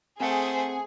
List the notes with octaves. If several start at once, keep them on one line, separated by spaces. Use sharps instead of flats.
A3 C4 G#4 C5 F#5 C#7